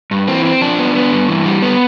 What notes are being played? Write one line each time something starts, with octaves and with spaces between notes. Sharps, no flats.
G2
E3 C4
C4
F3 D4
B3
B3
G2
E3
G3
B3